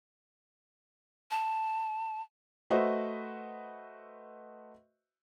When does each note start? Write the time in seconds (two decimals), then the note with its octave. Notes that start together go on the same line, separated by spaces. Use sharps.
1.31 A5
2.70 A3 F#4 B4 C5 D#5 E5